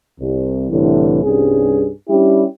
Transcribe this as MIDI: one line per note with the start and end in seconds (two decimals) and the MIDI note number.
0.21 0.65 36
0.71 1.20 36
0.71 1.20 45
0.71 1.20 50
0.71 1.20 52
1.24 1.89 36
1.24 1.89 43
1.24 1.89 61
1.24 1.89 68
2.09 2.44 55
2.09 2.44 61
2.09 2.44 62
2.09 2.44 64
2.09 2.44 67